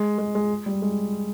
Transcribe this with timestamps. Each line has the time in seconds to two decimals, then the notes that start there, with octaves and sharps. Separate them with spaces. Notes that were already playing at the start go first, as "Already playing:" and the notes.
Already playing: G#3
0.18 G#3
0.35 G#3
0.66 G3
0.82 G#3